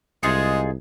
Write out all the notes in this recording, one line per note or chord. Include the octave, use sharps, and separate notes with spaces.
C2 G#3 D#4 F4 G#4